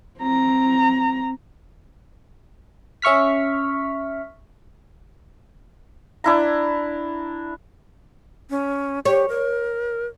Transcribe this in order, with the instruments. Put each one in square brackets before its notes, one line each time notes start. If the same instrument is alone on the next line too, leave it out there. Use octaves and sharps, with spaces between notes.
[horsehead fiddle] C4 A#5
[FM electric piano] C#4 E5 C#6 F6 B6
[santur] D4 E4 A#5
[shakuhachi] C#4
[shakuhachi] G4 [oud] C#5
[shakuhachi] A#4